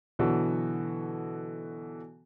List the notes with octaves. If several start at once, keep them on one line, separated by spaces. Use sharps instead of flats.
B2 D3 E3 F#3 F#4 A4